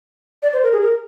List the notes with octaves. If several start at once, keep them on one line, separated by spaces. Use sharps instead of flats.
D5
C5
A#4
G#4
A#4